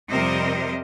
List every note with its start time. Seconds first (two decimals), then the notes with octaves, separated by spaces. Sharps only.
0.11 F2 C3 G3 A#4 C5 D#5